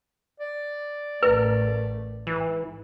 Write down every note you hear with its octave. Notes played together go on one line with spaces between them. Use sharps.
D5
A1 A3 A#4 B4
G#2 E3